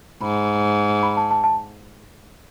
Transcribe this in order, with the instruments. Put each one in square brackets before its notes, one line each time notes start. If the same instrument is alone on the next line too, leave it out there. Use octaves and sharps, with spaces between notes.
[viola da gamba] G#2 [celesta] B5
[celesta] B5
A5
A5
A5